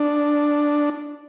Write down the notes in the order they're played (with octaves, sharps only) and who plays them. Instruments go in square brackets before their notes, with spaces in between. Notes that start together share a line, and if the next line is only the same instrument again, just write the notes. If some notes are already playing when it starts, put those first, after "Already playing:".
Already playing: [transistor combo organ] D4